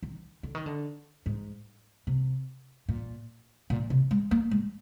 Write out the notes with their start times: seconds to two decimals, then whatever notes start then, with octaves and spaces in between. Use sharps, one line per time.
0.03 D#3
0.43 D3
0.55 D#3
0.66 D3
1.26 G#2
2.07 C3
2.89 A#2
3.70 A#2
3.90 C3
4.11 G#3
4.31 A#3
4.51 G#3